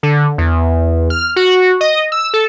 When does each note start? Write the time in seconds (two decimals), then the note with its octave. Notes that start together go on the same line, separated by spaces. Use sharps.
0.03 D3
0.38 E2
1.10 F6
1.36 F#4
1.81 D#5
2.12 E6
2.34 A4